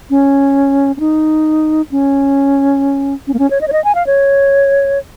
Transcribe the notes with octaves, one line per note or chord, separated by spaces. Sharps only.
C#4
C#4
D#4
C#4
C#4
A#3
C#4
C#5
D#5
C#5
D#5
G#5
F5
C#5